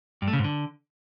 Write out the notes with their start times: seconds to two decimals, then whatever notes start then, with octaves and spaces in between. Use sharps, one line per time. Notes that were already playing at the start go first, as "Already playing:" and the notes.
0.22 G2
0.28 A3
0.33 C#3
0.39 G#2
0.44 D3